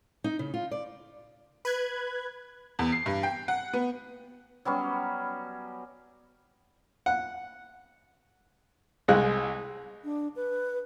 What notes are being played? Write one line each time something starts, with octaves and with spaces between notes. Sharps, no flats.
D#4
C#3
F4
D5
B4 F#6 G#6
E2
C7
G2
G5
F#5
B3
F#3 G3 B3 C#4
F#5
C2 G#3 F#6
D4
B4